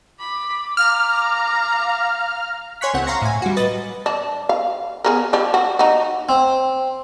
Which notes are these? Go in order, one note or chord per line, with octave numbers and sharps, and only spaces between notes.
B5 D6
F5 A#5 F6
C#5 G#5 C6 C#6 F#6 B6
C#2 C4 F#5
F5 A#5 C6 C#6 A#6
A2 G#5
G3 F#4
B4 D#5 A6
D4
F5
B3 G#4 A#4
F3 G3 D4
F#4
D#4 F#4
C4